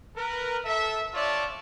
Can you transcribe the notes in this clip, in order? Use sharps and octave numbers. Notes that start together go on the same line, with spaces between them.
A#4 B4
A4 E5
D4 F4 C#5 D5 E5 A5